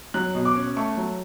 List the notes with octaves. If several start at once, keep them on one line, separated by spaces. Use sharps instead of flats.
F#3 F#6
B2
D6
C#4
A3 C#6
F#3